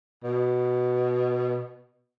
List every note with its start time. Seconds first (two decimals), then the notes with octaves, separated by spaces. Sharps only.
0.24 B2